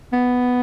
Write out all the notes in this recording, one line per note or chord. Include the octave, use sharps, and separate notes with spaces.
B3